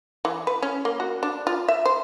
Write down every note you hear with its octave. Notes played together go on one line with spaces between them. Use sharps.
E3
B4
C#4
A#3
F#4
D4
F4
E5
C5